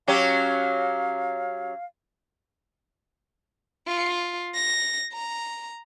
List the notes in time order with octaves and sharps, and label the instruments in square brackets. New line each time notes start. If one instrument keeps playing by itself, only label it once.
[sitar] F#3 C#4 G4 [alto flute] F5
[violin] F4
A#6
A#5